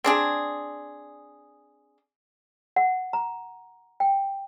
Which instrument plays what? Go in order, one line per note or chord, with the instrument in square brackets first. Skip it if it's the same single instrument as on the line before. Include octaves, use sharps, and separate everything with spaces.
[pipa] C4 D4 G#4
[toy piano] F#5
A#5
G5